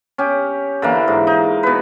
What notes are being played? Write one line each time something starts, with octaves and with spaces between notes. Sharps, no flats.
C#4 G4
D3 E3 A#3
G#2
D#4
B2 B4